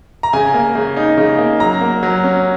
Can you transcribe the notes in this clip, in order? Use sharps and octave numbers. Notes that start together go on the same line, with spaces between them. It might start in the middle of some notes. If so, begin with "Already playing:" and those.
A#5
C#3 G#5
A#3
C#3
D#4
C#3
A#3
F#3 A#5
A#3
F#3
C#4